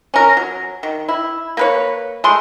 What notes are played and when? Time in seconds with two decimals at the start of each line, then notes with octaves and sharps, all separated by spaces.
0.14 C#4 A#4
0.37 F#3
0.83 D#3
1.08 E4
1.57 A#3 B4 C#5
2.24 G#3 A3 C6